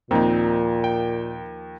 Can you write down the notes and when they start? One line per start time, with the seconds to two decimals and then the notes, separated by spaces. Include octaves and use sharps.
0.11 D#2 A#2 F3 C4 D#4
0.84 G5